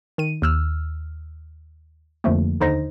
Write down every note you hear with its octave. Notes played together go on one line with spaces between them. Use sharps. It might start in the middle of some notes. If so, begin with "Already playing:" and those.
D#3 D#7
D#2 E6 F6
F2 D3 F3 A3 A#3
D#2 D3 D#4 C5 A#6